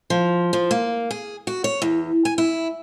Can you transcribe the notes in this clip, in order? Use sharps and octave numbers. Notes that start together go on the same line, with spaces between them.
F3
F3
A#3
G#4
F#4
C#5
E2
G#5
E4